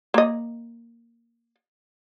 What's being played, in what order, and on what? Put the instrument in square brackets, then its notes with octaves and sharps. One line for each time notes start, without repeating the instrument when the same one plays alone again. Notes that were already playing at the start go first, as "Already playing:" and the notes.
[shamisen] A#3 D#5